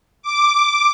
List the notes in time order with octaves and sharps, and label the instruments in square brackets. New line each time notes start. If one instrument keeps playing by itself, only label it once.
[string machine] D6